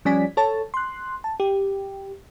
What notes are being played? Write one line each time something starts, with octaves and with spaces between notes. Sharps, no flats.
F3 G3 C#4 D5 G#5 B6
A4 C#5 A5
C6 F#6
A5
G4